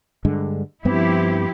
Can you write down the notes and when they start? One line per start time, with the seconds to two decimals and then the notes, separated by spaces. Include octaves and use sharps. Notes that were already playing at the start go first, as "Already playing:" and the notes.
0.25 G2 D3 G#3
0.85 G2 F3 B3 C4 E4 G4